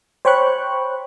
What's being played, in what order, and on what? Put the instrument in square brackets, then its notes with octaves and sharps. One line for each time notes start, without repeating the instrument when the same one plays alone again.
[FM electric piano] C5 C#5 G5 B5 C#6 F#6